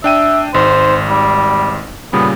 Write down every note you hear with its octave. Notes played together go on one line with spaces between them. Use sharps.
D4 E5 G5 D#7
G#1 G#2 C5
G3
A#2 C#3 G3 B3